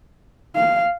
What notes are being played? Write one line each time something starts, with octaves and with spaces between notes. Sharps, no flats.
F5